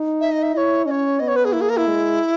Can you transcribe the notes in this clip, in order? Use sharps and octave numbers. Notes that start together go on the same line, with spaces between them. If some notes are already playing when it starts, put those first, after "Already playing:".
Already playing: D#4
E5
D#5
E5
E4 C#5 D#5
C#4 C#5 D#5
B3 D#5
C#5
B4
G#4
A#3 E4
G#4
A#4
E4
G#3